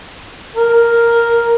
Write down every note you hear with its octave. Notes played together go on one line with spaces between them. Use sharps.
A#4